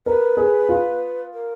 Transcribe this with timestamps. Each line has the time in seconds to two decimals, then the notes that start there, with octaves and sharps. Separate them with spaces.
0.06 A#4 B4
0.37 G#4
0.69 F4
1.33 A#4